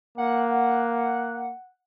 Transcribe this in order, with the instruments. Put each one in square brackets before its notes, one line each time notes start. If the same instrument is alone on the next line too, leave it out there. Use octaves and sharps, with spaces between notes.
[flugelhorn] A#3 [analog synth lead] F#5